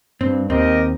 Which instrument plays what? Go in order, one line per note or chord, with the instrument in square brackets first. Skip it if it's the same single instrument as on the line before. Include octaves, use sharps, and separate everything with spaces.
[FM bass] G2 [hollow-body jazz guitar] C4
[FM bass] D#2 [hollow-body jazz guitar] C4 [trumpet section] G4 A#4 D#5